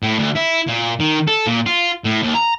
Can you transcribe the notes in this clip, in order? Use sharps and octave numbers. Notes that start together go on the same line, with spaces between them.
A2
D2
E4
A#2
D#3
A4
A#2
F4
A2
D#2
A#5